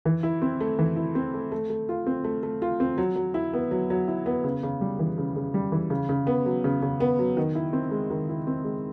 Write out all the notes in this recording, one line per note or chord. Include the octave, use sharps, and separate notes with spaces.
E3
E4
C4
A3
E3
E4
C4
A3
A3
A3
F4
C4
A3
A3
F4
C4
F#3
F#3
E4
B3
F#3
F#3
E4
B3
C#3
C#3
G3
E3
C#3
C#3
G3
E3
C#3
C#3
B3
F#3
C#3
C#3
B3
F#3
D#3
E4
C4
G#3
D#3
E4
C4
G#3